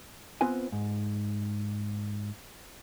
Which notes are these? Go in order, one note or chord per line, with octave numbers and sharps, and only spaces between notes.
B3 C4 F4 B4 C5 G#5
G#2